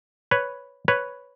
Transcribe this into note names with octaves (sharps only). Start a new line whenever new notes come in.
B4 C#5
B4 C#5